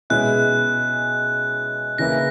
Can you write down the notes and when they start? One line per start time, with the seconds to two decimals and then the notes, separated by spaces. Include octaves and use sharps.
0.10 B2 G#3 C#4 E4 F#6
1.98 C#3 E3 A#3 E4 A#6